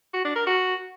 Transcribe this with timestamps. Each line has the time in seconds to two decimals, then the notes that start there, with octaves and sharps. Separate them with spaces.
0.14 F#4
0.25 D4
0.36 A#4
0.47 F#4